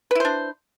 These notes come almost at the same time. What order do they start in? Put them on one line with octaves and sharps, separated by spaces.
B4 E4 C5 D4